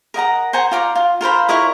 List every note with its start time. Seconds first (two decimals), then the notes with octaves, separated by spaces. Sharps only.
0.14 A#4 D#5 F#5 A#5
0.53 C5 F#5 G#5 A#5
0.71 F4 D5 A#5
0.95 F4
1.21 F4 A#4 C5 B5
1.48 E4 A#4 C#5 D#5